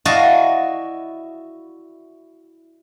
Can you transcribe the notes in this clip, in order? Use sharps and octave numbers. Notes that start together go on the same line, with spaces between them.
E4 F#4 D5 D#5 F5 A5